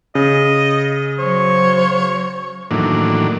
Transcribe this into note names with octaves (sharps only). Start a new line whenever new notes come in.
C#3 D#5
F#3 C5 C#5
A2 D#3 E3 F#3 A#3 D4